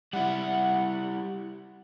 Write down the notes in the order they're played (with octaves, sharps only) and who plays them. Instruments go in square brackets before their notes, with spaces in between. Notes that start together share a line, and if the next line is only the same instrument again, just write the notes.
[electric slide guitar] G3 E4 [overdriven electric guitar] F#5